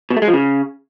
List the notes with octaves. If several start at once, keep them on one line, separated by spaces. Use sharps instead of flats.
B2
A3
G#3
F3
C#3